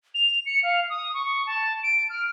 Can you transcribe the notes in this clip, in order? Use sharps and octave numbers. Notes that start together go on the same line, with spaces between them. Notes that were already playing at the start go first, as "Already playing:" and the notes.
F7
C#7
F5
D#6
C#6
A5
D7
F6